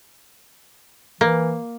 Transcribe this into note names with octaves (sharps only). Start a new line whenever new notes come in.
E3 A#3